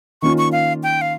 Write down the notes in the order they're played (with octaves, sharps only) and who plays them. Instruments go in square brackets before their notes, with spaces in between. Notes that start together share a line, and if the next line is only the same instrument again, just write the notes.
[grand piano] D#3 A#3 C#4 F4 [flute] C#6
[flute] C#6
F5
G5
F5